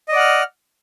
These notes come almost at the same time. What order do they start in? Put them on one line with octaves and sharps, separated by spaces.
D#5 D5 F#5 F6